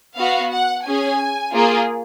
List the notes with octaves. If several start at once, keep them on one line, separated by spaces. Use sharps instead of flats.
B3 F#4 F5
F#5
C#4 G#4 G#5
A#3 F4 G#4